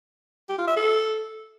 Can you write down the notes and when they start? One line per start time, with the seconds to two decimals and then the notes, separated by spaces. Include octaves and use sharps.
0.49 G4
0.58 F4
0.67 E5
0.76 A4